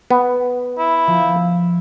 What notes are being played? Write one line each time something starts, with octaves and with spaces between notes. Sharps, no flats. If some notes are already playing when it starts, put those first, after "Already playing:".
B3
E4
F3